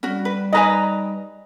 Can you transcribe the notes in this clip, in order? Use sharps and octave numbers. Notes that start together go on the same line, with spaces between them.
G3 C#4 F#4
B4
D#4 B4 D#5 G#5 A#5